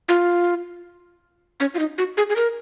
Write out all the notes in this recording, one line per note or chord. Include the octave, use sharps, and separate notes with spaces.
F4
C#4
F4
D#4
F#4
G#4
G#4
A#4